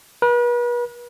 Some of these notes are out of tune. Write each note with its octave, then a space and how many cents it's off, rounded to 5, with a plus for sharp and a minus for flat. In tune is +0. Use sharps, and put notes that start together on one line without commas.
B4 -40